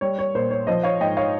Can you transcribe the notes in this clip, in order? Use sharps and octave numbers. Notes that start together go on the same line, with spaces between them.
G3 C#5
C#5
A#2 C5
C#5
F3 C5 D#5
C#5 F5
G#2 D#5 G5
C#5 F5